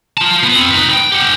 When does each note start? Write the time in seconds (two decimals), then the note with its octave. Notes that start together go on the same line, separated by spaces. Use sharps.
0.18 F4 A5
0.44 B3
0.55 C4 F4
0.71 D#4 B4
0.94 G5
1.12 G4 F#5